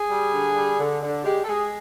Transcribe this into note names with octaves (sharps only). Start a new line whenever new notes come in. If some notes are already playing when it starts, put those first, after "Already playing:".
Already playing: G#4
G3
D3
G3
D3
D3
G#3 G4
A4
G#3 G#4